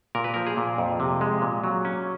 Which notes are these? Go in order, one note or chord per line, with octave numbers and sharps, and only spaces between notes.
A#2 A#4
B4
F3 A#4
G#4
A#2
F2
C3
G#3
A#2
F#3
C#4